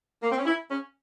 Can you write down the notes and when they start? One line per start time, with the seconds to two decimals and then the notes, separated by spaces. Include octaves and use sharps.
0.23 A#3
0.31 C4
0.38 C#4
0.46 E4
0.70 C#4